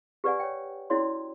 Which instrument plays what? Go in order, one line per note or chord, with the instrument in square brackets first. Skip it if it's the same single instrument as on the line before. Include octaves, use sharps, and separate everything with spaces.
[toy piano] G4 B4 D5 F#5 G#5
C#5 G5
C#4 E4 F#4 C#5 D5 C6